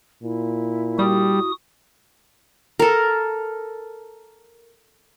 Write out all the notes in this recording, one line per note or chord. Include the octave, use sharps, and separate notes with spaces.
A#2 E4
G3 F#4 D#6
A4 A#4